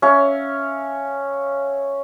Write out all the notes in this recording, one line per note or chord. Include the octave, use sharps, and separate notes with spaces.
C#4 E5 F5